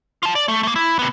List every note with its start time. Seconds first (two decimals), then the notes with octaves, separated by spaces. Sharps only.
0.23 F4 A5
0.35 D5
0.48 A3
0.63 A3 A#3
0.76 E4
0.99 C3 B3